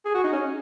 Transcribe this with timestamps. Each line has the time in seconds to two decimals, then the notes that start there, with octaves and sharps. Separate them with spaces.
0.05 G#4
0.14 F#4
0.24 D#4
0.33 C#4